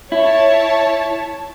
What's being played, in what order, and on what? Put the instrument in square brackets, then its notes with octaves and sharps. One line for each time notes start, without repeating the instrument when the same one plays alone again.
[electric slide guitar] E4 [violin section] C#5 A5